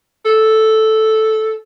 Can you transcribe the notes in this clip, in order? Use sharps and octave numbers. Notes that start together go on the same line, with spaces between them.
A4